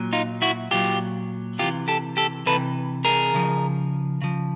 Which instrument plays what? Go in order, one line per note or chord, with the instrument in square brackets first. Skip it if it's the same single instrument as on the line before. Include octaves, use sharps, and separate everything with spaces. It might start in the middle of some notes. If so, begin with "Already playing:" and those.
Already playing: [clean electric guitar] A#2 F#3
D#4 F4
E4 F#4
A#2 F#3 F4 G4
C3 E3 F4 G4
G4 A4
G4 A4
C3 E3 A4 B4
G#4 A#4
C#3 F3
C#3 F3